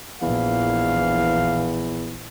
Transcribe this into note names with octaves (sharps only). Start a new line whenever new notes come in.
A#1 E2 E3 F5